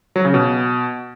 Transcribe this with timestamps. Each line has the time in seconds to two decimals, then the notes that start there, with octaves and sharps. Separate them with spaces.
0.16 F#3
0.25 C#3
0.34 B2